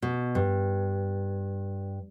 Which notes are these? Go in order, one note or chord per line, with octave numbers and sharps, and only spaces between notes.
B2
G2